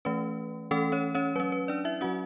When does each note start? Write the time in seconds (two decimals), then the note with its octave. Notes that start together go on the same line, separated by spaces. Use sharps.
0.05 E3 A3 C#4 B4
0.71 E3 A3 C#4 A4
0.92 C#4 C#5
1.15 C#4 C#5
1.36 F#3 C#4 B4
1.52 B4
1.68 D4 D5
1.85 E4 E5
2.01 F#3 C#4 F#4 F#5